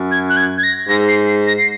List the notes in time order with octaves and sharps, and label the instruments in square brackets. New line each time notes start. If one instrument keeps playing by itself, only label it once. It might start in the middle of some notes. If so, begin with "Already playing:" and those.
Already playing: [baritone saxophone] F#2
[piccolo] G#6
F#6
G#6
G#6
A#6
[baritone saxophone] G#2 [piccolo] A#6
[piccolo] C7
C7
A#6
C7